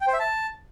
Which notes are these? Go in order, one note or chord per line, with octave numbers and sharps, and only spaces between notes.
G5
C5
E5
A5